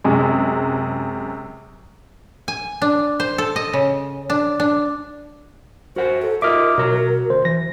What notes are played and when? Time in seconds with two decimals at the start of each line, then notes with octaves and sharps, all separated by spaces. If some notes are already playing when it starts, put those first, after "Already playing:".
0.04 F#2 C3 G#3
2.48 G#5
2.82 D4
3.20 C5
3.38 A4
3.56 D#5
3.73 C#3
4.30 D4
4.60 D4
5.96 F#4 A#4 C5 F#5
6.22 A4
6.42 F4 A#4 D#5 E5 D6 D#6 F6
6.78 B2 F#4 C#5 A#5
7.30 D2 C5
7.45 E3 A#6